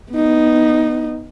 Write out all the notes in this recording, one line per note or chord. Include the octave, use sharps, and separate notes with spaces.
B3 D#4